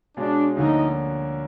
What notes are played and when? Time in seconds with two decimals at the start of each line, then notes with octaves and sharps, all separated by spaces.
0.17 B2 G#3 C#4 D4 F4
0.56 D2 D3 F3 A#3 C#4 D#4